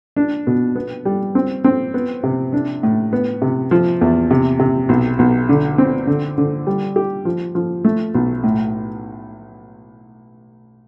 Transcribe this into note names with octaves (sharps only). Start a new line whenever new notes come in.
D4
B2
B3
G3
C4
C4
B3
C3
D4
A2
B3
C3
F3
E2
C3
C3
B1
B1
D3
C4
D3
D3
G3
G4
F3
F3
A3
B1
A2